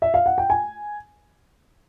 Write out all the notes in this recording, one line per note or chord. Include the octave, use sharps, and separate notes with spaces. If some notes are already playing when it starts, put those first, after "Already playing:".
E5
F5
F#5
G5
G#5